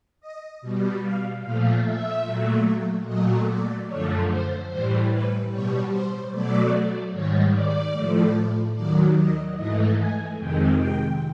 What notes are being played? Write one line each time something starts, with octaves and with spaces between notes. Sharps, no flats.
D#5
B2 G3
F5
A#2 F3 A3 F5
E5
A#2 F#3 A3
A#2 F#3 A3 D#5
D5
F#2 D3 F3 A3 C#5
C5
A2 E3 G3 C5
B4
B2 G3 C#5
C5
B2 F#3 A3 D5
G#2 D#3 G3 C#5
D5
A2 F3 A3
D#2 D#3 F#3 D5
D#5
G#2 E3 A3 D#5
G#5
F2 C3 D#3 G#3 G5
G5